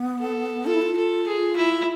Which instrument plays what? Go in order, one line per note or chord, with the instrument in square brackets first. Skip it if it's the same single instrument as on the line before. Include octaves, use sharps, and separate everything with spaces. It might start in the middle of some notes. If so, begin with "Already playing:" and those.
Already playing: [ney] B3
[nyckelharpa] A4
[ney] F4 [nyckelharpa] A4
[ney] E4
F4
[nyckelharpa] A4
G#4
E4